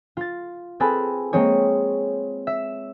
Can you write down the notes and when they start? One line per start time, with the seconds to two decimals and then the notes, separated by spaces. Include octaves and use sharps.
0.17 F4 A6
0.80 C4 G#4 A4 B4 G#5 B5
1.33 G#3 A#3 C4 G#4 C#5
2.47 E5